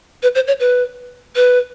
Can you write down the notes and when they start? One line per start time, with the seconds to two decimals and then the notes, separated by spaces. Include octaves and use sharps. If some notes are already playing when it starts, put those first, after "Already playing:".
0.23 B4
0.35 C5
0.47 C#5
0.60 B4
1.36 B4